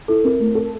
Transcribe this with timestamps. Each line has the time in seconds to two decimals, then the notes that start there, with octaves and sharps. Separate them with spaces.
0.08 E4 A4
0.24 C4 A#4
0.40 A3
0.55 A4